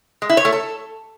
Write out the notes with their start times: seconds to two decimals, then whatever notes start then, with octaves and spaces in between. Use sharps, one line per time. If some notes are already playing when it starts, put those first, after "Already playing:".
0.22 G#3
0.29 E4
0.37 C#5
0.45 A3
0.52 A4